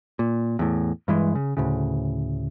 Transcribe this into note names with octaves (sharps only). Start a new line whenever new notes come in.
A#2
E2 A2
G2 E3 G#3
C#3
D2 A2 C#3